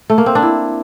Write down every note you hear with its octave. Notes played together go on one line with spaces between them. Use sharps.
A3
A#3
C4
D4
E4